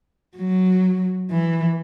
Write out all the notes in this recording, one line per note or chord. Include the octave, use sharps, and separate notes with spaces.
F#3
E3